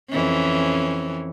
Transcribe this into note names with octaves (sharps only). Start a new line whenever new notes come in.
F2 E3 C#4